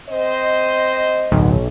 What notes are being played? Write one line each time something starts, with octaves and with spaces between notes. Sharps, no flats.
C4 C5 D#5
D1 B1